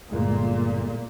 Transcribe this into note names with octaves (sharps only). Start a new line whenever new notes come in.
G1 A#2 G#3